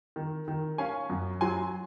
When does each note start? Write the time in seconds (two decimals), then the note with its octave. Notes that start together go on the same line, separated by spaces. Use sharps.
0.16 D#3
0.48 D#3
0.78 C#4 F5 G#5
1.10 F#2
1.41 F#3 G#5 C6